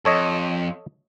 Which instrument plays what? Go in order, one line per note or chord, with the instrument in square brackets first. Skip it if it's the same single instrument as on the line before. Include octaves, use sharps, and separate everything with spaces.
[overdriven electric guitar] F2 [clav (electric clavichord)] A4 C#5 D#5